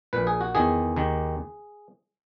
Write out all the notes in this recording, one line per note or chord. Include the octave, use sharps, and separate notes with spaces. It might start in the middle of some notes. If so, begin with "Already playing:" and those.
A#1 A#2 B4
G#4
F#4
E2 D#3 G#4
D#2 D#3